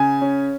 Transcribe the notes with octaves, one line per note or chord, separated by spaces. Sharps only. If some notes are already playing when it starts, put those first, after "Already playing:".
Already playing: C#3 G#5
C#4